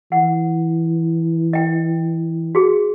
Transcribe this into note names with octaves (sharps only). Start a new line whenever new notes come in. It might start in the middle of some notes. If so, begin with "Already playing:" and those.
E3 F#5
D#5 G5
F#4 G#4